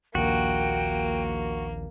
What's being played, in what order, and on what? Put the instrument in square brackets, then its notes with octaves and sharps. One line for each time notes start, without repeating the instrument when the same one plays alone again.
[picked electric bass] A#1 D#2 [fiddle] A#3 [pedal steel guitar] F#4 [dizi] G5